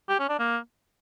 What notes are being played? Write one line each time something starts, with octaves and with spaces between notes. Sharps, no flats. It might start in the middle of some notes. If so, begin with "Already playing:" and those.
G4
C#4
D4
A#3